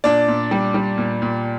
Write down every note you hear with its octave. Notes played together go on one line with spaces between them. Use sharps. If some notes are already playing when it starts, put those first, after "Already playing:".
A#2 D4 D5
A#2
G3
G3
A#2
A#2